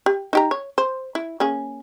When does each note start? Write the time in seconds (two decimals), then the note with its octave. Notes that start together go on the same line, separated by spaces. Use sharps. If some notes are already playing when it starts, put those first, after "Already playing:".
0.06 G4
0.33 D#4 G4 A#5
0.51 C#5
0.78 C5
1.15 E4
1.40 A#3 C#4 G#4